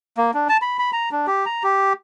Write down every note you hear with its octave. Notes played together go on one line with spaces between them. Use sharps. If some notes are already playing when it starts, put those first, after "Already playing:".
A#3
D4
A5
B5
B5
A#5
D4
G4
A#5
G4